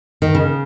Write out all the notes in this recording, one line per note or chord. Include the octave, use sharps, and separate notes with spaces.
D#3
C#3